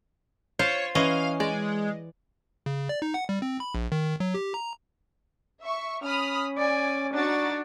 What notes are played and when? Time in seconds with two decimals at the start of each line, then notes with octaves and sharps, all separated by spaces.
0.59 F4 C5 C#5 F5
0.95 E3 C#4 D#5 F5
1.40 G#3 D5
2.66 C#3
2.89 D5
3.02 D#4
3.14 F#5
3.29 G3
3.42 C4
3.60 B5
3.75 A#1
3.92 D#3
4.20 F#3
4.34 G4
4.54 A#5
5.62 E5 C#6
6.03 C#4 B5 D#6 F6
6.58 D5 G#5
7.13 D4 D#4 F#4 A6